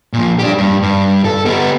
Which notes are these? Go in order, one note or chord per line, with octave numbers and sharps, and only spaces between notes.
A#2 F3
D4 G4
G2
G2
A4
B3 G4